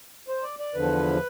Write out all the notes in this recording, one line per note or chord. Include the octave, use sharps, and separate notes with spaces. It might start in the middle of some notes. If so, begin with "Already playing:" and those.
C5
D5
D5
E2 D3 F3 B4